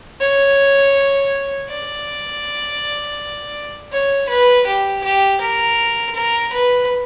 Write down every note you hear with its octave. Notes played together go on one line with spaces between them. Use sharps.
C#5
D5
C#5
B4
G4
G4
A#4
A#4
B4